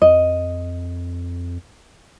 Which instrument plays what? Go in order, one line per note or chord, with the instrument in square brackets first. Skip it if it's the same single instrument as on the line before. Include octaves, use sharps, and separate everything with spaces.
[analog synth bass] F2 [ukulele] D#5